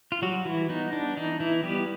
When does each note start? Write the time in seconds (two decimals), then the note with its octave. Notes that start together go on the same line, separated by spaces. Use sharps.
0.12 F4
0.22 F#3 G3 F#4
0.45 E3 E4
0.69 B3 D#4
0.93 D4
1.17 E3 D#4
1.40 E3 E4
1.63 G3 B3 G4